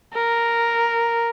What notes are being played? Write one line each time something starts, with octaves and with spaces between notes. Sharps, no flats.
A#4